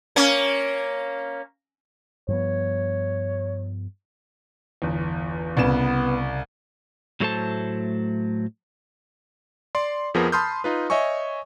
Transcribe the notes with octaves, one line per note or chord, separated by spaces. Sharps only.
A#3 C#4
G2 F3 B3 C#5
G1 E2
C2 C#3 B3 E7
A2 F#3 A3 A4 C5 A5
D5 C6
F2 F3 B3 G#4 A#4
A5 B5 C6 D#6 F6 G6
D#4 F4 B4
C#5 D#5 E5 G#5 C#6